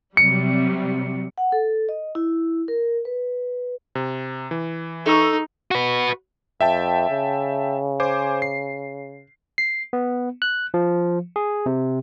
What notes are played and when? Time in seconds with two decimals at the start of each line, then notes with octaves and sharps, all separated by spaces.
0.17 C3 F#3 G3 C#7
1.38 F#5
1.52 A4
1.89 D#5
2.15 E4
2.68 A#4
3.05 B4
3.95 C3
4.51 E3
5.06 D#4 A4 C#6 E6
5.71 F#4 B4
6.61 F2 E5 G5 A5
7.10 C#3
8.00 C5 G#5 D6
8.42 C7
9.58 C7
9.93 B3
10.42 F#6
10.74 F3
11.36 G#4
11.66 C3